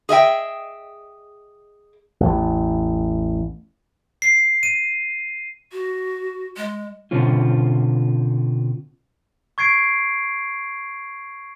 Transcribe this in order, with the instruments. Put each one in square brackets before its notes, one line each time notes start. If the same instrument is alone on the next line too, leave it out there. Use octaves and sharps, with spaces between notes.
[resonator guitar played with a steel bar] G#4 D#5 E5 G5
[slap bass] A1 E2
[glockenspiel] C7
D#7
[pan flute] F#4
G#3
[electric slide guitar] B2 D3 C4 C#4 F4
[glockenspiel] C#6 G#6 C7 D7